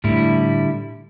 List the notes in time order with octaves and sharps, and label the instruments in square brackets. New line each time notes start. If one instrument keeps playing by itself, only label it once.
[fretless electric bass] A2 [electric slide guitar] D3 G3 E4